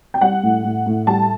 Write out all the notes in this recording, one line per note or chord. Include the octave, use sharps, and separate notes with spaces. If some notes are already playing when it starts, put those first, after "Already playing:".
G5
G3 F#5
A2
A2
A2
G3 A5